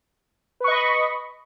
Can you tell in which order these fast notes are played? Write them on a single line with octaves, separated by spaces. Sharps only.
B4 C#6 D#5 B5